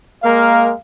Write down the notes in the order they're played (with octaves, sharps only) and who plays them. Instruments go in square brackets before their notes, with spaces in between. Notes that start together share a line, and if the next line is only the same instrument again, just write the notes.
[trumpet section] G#3 A#3 A#4 [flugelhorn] F5